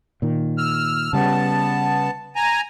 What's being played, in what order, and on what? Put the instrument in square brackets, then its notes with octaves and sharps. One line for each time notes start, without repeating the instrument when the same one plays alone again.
[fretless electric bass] A#2 D#3
[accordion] E6 F6
[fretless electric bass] C#3 G3 [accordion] B3 A5
[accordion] G#5 A#5